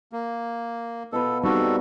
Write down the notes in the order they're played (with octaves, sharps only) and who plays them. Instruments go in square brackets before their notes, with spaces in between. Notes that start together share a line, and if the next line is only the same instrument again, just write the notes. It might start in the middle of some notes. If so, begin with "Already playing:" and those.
[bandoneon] A#3
[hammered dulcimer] B2 F4 B4 [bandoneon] A4
[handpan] G3 C4 D#4 [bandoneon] F#4 A4